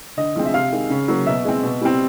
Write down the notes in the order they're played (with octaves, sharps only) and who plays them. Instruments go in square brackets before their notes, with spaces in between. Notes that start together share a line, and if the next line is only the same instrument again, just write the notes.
[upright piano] D3 D#5
F3 G#3 C4
E5
C3 F5
D#3 G#3
C#3
F#3 A#3
B2 E5
G#3 C4
B2
G3 C4